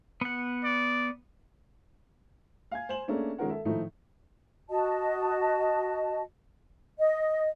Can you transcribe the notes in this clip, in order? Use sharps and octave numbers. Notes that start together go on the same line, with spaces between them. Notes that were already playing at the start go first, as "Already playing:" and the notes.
B3 F#5
D5
F5 G#5 G#6
C5 G#5 E7 F#7
A3 A#3 C#4 D4 G#4 A4
D#3 G#3 C#4 F4 A#4 F#5
A4 E5
A2 D#3 F3 A3 D#4 E4
F#4 D#5 A5
D#5